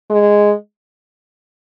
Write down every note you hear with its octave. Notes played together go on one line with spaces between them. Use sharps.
G#3